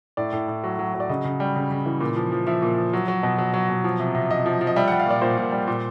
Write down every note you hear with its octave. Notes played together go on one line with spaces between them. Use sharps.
A2 D5
A2
A2
F#3
F#3
F#3
D5
C#3 D#5
C#3
G3
C#3
C#3
E3
A#2
F3
F3
F3 E5
A#2
F3
F#3
F#3
B2
F#3
F#3
B2
F3
C3
C3
C3 D#5
F3
F3
D#5
G3 E5
F#5
G3
F5
A#2 D5
A#2 C5
A#2
G3
A#2